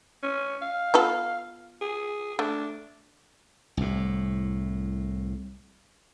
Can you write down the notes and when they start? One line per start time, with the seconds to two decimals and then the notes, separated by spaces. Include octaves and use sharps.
0.23 C#4
0.62 F5
0.94 B3 F4 A4
1.82 G#4
2.39 A3 D4
3.77 C2 A2